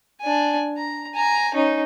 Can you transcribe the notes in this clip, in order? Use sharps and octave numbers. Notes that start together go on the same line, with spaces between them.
D4 G#5
A#5
G#5 A#5
C#4 D#4